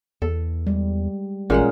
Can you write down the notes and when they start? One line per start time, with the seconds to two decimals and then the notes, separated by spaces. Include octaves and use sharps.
0.22 E2 A4
0.67 G3 G#3
1.50 A1 A#2 G#3 C#4 G#4 A#4 F#5